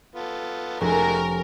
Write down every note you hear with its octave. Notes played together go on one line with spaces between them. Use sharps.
B3 F4 A4
F1 G#3 A3 C#4 F#4 A#4